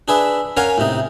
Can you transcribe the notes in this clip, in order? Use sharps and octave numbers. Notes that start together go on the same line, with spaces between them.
D4 G#4 B4 E5
C#4 A#4 C#5 F5 F#5 G#5
A2 C3 D#4